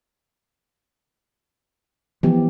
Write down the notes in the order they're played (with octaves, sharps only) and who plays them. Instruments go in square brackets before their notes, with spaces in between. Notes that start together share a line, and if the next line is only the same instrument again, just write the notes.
[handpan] E3 G4 [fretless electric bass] F3 B3